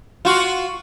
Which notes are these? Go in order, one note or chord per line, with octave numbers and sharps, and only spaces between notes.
F4 F#4